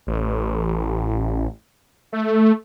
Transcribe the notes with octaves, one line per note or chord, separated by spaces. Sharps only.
A1
A3